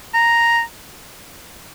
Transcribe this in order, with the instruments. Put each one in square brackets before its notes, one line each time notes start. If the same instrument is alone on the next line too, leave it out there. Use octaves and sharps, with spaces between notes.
[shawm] A#5